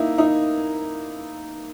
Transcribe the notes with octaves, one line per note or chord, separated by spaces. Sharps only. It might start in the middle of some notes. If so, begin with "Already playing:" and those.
Already playing: A#3 D#4 E4
D#4